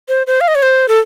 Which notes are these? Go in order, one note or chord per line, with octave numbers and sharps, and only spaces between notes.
C5
C5
F5
D#5
C#5
C5
A4